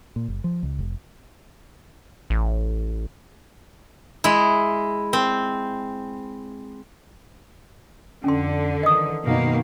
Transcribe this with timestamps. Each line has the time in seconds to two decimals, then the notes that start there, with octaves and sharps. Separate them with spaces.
0.16 A#2
0.28 F#1
0.44 F3
0.63 C#2
0.79 F1
2.30 A1
4.24 G#3 E4
5.13 C4
8.24 F2 D3 C#4 C6
8.83 D#3 E3 D#5 D#6
9.24 F#2 B2 D#3 A#3